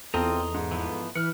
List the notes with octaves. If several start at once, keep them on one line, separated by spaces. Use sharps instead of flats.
E2 C4 F4 A4 C5 D#5 A#5
G#2
E3 F3 B3
E3 B4 F6 C#7